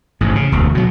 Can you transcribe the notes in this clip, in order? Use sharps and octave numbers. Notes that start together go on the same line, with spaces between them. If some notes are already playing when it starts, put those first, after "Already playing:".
A1 G#2
C#3
E1 D2
B2 F#3